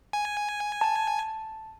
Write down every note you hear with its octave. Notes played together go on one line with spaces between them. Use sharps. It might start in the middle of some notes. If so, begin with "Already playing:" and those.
G#5
A5